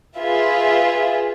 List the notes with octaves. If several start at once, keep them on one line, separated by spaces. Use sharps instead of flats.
F4 G#4 B4 E5